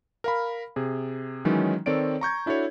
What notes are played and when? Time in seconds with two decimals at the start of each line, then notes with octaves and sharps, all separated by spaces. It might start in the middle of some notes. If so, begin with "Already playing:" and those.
0.24 A#4 F5 B5
0.76 C3 G#4
1.45 D#3 E3 F#3 G#3 C#4 D#4
1.86 D#3 C4 A4 C#5 D5 D7
2.21 A#5 C#6 G6 G#6
2.46 D4 E4 F#4 A4 C#5